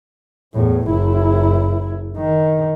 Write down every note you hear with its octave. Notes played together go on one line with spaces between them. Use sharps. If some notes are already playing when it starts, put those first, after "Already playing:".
E2 A2
F#1 E4
D#3